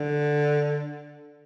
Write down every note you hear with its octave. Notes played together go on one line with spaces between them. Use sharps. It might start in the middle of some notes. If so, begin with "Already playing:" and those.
Already playing: D3